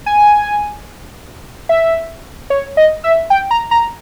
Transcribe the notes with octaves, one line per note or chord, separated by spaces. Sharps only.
G#5
E5
C#5
D#5
E5
G5
A#5
A#5